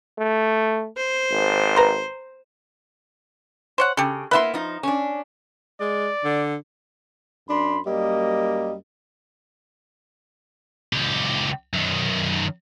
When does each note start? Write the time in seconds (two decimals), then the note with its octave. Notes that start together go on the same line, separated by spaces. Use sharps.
0.18 A3
0.97 C5
1.31 G#1
1.76 B4 A#5 C6
3.78 C5 C#5 F#5
3.97 C#3 G4 A4
4.31 A#3 B3 E4 B4 E5 C6
4.54 F3 D#4
4.83 C#4 D4
5.81 G#3 D5
6.24 D3
7.49 F#2 D4 B5 C6
7.87 F#2 G3 A#3 D#5
10.93 C#2 G4
11.73 F#2 D#3